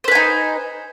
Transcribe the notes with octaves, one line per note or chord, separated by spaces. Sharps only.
D#4 B4 C5 G#5